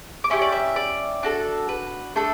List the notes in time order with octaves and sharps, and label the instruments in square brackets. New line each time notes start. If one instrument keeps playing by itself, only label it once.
[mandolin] D6
C#4 E4 G4 C#6
D5
E5
D5
D4 F#4 A4
B4
A3 D4 A4